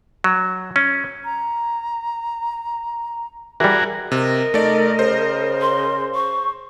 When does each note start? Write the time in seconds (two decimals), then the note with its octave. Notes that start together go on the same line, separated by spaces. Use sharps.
0.24 F#3
0.76 C#4
1.25 A#5
3.60 E3 G3 F#4 G#4 A#4
4.12 C3 A#4 D#5
4.54 A3 D#4 D5
4.99 C#3 C5
5.61 C6
6.15 C#6